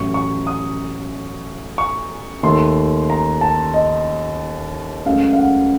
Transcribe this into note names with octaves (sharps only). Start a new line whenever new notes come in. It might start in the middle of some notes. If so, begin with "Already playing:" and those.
Already playing: A1 A2 F#3 C#6
C#6
D#6
C#6
D#2 D#3 A3 C6
A#5
A5
D#5
C#2 C#3 F#3 A3 F5
F5
F#5